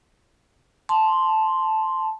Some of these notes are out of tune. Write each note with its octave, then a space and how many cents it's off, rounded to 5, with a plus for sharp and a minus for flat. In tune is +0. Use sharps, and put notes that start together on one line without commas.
A5 -10 C6 +0